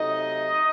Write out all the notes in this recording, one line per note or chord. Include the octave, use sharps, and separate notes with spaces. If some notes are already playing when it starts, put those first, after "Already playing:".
Already playing: C3 F#3 A3 D#4 D#5